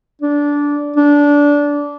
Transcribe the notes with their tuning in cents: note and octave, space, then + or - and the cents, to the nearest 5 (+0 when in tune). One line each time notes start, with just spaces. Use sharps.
D4 -15
D4 -20